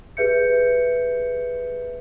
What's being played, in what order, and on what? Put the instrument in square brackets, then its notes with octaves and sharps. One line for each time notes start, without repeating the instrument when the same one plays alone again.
[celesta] G4 G#4 B4 E5 G6 C#7